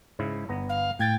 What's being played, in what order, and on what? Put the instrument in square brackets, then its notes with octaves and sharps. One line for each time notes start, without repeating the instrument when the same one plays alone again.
[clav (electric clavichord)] G#2 C#3 E4
G1 B3 A#5
[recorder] F5
[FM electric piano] A2 G#6 A6 [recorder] G5